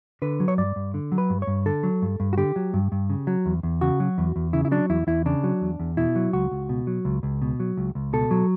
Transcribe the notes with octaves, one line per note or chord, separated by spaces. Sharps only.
D3 B4
F#3
C#5
G2 D5
G2
D3
F#3
B4
G2
C#5
G2
D3 A4
F#3
G2
G2
F#4
D3 G4
F#3
G2
G2
C#3
F#3
E2
E2
C#3 F#4
F#3
E2
E2
C#3 E4
E4
F#3 D4
E2 E4
E2 E4
C#3 D4
F#3
E2
E2
B2 E4
F#3
C#2 F#4
C#2
B2
F#3
C#2
C#2
B2
F#3
C#2
C#2
B2 A4
F#3